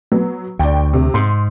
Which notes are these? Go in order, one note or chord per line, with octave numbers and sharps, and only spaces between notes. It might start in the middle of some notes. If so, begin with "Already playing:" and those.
F#3 B3
D2 D5 G5
C3
G#2 C6